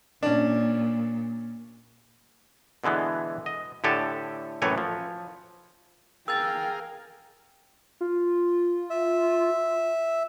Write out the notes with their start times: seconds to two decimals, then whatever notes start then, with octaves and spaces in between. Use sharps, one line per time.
0.23 A#2 C#4 D4
2.84 B2 D3 E3 G#3 B3
3.46 D#5
3.84 A2 D3 G4 A4 G#5 A5
4.62 F#2 A2 E3 A3 C#5 G#5
4.78 F3
6.28 G#4 A#4 F5 G5 E6 A6
8.01 F4
8.90 E5